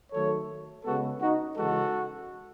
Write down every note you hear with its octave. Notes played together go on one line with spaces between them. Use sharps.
D#3 F#3 A3 A4 C#5
C#3 G#3 B3 F#4 A4
D#4 F#4
C#3 E3 G#3 F#4 A4